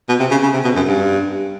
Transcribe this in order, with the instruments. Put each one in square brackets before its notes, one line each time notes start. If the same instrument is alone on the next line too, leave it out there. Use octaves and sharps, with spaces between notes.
[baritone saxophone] B2
C3
C#3
C#3
C3
B2
F#2
G2